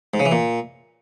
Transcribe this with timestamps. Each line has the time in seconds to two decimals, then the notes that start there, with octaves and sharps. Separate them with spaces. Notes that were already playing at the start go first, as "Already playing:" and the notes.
0.14 G#2
0.20 C#3
0.26 E3
0.32 A#2